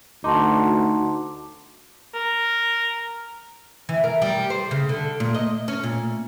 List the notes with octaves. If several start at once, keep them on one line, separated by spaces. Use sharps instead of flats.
D2 D#4 F#4 A5 C6 D6
A#4
E3
A#4
G3
C5
C#3
D3
A#2
D#5
C#4
A#2